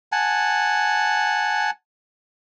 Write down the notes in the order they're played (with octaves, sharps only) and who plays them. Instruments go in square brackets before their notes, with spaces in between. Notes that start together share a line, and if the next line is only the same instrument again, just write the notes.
[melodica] F#5 G#5 A5